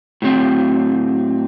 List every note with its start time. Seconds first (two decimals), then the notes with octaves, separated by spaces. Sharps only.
0.22 A2 F#3 C4